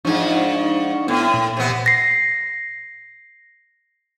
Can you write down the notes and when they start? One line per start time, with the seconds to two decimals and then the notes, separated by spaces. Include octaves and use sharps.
0.05 G#2 F3 D4 D#4 C#6
1.08 A2 B3
1.34 A#2
1.57 C3 B3
1.86 A#6 C7